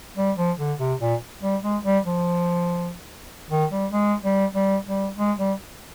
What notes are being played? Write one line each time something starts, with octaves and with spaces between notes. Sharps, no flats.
G3
F3
D3
C3
A#2
G3
G#3
G3
F3
D#3
G3
G#3
G3
G3
G3
G#3
G3